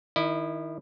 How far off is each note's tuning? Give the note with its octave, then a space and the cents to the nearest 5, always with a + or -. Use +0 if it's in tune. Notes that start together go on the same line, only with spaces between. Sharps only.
D#3 +0 E4 -5 D#5 -40